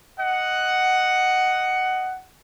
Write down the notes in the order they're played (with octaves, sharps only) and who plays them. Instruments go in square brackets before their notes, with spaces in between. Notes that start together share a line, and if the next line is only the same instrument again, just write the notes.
[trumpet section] D#5 F#5